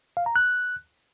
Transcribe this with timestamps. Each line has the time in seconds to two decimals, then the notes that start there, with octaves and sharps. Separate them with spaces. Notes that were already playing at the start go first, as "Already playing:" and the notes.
0.17 F5
0.26 A#5
0.36 F#6